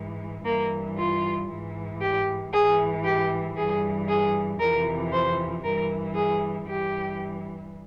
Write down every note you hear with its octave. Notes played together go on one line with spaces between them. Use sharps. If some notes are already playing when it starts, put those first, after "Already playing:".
Already playing: G#2 E3
G2 E3 A#3
F4
G#2 E3
G4
G#2 E3 G#4
G4
G2 E3 G#4
G#4
F2 C3 E3 A#4
C5
G2 E3 A#4
G#4
G2 E3 G4